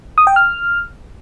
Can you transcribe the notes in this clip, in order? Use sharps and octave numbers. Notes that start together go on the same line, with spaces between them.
D#6
G5
F6